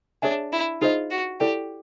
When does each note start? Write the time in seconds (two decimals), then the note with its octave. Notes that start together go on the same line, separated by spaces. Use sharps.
0.22 D4 G#4 C#5 E5 G#5
0.52 E4
0.81 D#4 F4 G#4 C5 D#5
1.11 F#4
1.40 E4 G4 A4 D5 G5